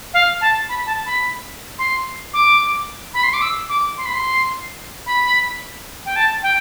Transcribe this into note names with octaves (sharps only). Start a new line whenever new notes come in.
F5
A5
B5
A5
B5
C6
D6
B5
C6
D6
E6
D6
C6
B5
C6
B5
G5
A5
G5